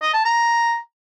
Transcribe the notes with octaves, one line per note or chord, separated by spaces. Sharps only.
D#5
A5
A#5